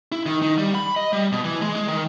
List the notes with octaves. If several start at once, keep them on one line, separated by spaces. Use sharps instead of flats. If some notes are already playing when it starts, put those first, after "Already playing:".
E4
D#3
D#3
G3
B5
D#5
G3
B2
E3
G#3
G#3
D#3